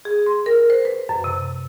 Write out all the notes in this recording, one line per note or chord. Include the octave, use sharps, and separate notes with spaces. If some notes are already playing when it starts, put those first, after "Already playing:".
G#4
C6
A#4
C5
B4
F#2
C3